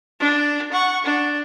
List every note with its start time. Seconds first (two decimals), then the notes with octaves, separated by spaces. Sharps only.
0.20 D4
0.72 F#5 C#6
1.05 D4